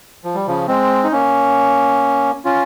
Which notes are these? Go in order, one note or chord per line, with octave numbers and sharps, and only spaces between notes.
F3
G3
C#3 F3
G#3 C4
D#4
A#3 C#4
C#4 F4